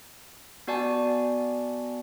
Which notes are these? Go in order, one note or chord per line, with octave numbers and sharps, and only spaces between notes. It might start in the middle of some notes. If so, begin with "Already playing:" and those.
B3 F#4 D5 G#5 A5